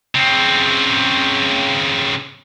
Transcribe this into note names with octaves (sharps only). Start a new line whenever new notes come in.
C#3 C4